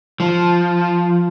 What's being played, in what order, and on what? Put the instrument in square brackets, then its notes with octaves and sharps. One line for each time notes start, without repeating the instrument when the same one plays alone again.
[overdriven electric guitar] F3